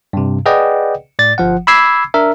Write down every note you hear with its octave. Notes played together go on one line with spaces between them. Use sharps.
G2 C3
G#4 B4 D5 D#5 F#5 G5
A2 D5 A6
G1 F3 F#5
B5 D6 E6 G#6 C7
D4 A#4 E5